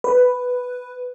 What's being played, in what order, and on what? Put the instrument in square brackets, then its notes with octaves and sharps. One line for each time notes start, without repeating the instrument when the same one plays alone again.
[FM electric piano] B4